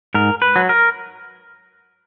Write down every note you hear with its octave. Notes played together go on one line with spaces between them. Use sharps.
G#2 A#4
B4
F#3
A#4